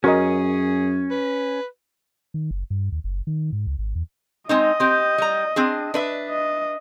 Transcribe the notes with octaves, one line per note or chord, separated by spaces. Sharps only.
F#2 C#4 F#4 G#4 A#4 D#5
B4
D#3
F#1
G2
D#2
F#1
D#3
G#2
C#2
G#1
E2
G#3 C4 D#4 D#5
C4 G4
G3 A#5
C4 D4 G#4
D4 B4 E5
D#5